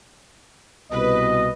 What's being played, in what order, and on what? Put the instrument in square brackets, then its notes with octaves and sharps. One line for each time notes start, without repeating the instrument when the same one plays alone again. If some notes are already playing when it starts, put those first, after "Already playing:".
[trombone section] C2 B2 [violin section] B4 [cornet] D#5